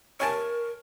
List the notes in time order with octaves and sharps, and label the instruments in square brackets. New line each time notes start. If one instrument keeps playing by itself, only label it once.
[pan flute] A#4 [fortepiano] C#5 G#5 A5